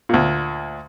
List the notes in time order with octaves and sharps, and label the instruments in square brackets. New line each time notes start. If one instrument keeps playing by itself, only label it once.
[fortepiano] D2 A#2